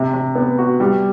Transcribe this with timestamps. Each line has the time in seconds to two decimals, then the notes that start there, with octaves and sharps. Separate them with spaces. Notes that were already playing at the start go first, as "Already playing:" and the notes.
Already playing: C3
0.14 C3
0.35 B3
0.58 F#4
0.80 G3